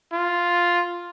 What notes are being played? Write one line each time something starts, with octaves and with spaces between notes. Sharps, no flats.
F4